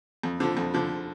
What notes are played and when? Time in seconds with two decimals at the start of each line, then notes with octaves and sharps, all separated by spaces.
0.23 F2
0.40 D3 F3
0.57 F2
0.74 D3 F3